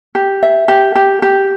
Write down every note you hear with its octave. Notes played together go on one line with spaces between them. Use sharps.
G4
E5
G4
G4
G4